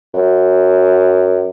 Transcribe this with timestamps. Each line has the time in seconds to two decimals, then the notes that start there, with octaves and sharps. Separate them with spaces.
0.14 F#2